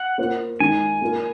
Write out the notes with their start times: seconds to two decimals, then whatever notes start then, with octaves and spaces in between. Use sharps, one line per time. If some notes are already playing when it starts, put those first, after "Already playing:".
Already playing: F#5
0.18 A#3 F4 C5
0.60 D#3 G#3 D#4 G#5
1.01 A#3 F4 A#4